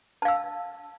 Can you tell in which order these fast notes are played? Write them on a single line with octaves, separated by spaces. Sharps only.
A5 F5 E6